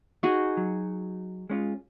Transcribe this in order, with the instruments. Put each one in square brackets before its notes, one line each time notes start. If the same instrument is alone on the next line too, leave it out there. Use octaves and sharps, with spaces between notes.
[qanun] D#4 F#4 G#4
[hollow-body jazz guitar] F#3
G#3 C#4 F4